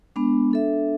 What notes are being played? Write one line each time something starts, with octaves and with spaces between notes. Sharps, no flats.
G#3 B3 D4
D4 A4 E5